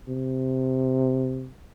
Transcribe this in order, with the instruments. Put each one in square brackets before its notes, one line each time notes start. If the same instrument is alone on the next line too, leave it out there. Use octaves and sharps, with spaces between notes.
[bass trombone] C3